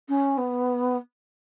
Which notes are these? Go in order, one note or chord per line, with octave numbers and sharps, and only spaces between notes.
C#4
B3